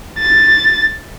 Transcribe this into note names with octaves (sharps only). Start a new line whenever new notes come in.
A6